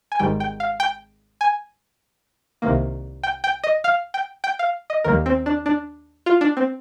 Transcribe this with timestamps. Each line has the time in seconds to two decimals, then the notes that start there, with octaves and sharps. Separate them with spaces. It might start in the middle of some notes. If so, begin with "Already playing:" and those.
0.12 G#5
0.19 G#1 G#2 D#3 G3 G5
0.40 G5
0.60 F5
0.80 G5
1.41 G#5
2.62 C2 C3 D#3 A#3
3.23 G5
3.44 G5
3.64 D#5
3.84 F5
4.14 G5
4.44 G5
4.59 F5
4.90 D#5
5.04 D#2 D#3 G3 A#3 A#4
5.26 C4
5.46 D4
5.66 D4
6.26 F4
6.41 D4
6.57 C4